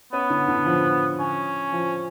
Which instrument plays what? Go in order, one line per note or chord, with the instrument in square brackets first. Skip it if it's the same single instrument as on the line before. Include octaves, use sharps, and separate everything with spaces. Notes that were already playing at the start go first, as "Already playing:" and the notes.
[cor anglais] B3 [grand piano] C#4
[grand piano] D3
D3
F3
[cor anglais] C#4
[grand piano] F3